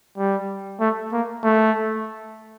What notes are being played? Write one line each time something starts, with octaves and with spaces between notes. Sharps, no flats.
G3
A3
A#3
A3